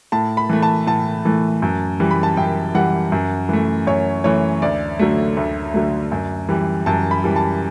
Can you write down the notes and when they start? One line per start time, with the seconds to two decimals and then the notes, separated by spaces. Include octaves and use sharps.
0.12 A2 A5
0.37 B5
0.50 E3 A3
0.63 A5
0.87 A2 A5
1.25 E3 A3
1.62 F#2
2.00 E3 G3
2.11 B5
2.23 A5
2.37 F#2 G5
2.75 E3 G3 F#5
3.12 F#2
3.49 E3 A3
3.87 F#2 C#5
4.24 E3 A3 C#5
4.62 D2 D5
4.99 D3 F#3 A3
5.37 D2
5.74 D3 F#3 A3
6.12 F#2
6.49 E3 G3
6.86 F#2 A5
7.11 B5
7.24 E3 G3
7.36 A5